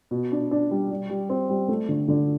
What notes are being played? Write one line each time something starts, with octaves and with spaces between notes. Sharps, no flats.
B2
D4
D4
G3
G3
G3
C4
G3
A3
D3
D3